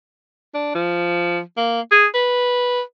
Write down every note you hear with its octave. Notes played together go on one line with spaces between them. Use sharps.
D4
F3
A#3
G#4
B4